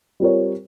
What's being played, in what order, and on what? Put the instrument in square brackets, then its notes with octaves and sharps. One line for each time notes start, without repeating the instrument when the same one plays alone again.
[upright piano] G3 C4 F4 A#4 C#5